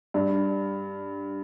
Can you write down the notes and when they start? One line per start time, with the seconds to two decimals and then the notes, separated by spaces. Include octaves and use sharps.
0.14 G2